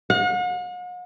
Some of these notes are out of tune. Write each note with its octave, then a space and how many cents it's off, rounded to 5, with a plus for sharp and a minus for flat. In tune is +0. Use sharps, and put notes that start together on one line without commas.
F#5 -45